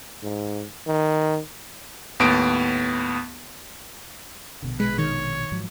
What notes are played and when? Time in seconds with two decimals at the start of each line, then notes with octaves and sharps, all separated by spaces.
0.23 G#2
0.87 D#3
2.20 D#2 A2 B3 D7
4.62 A#1 B2 D3
4.80 G#3 B4
4.98 D#3 C#5
5.52 G#2 F3 F#3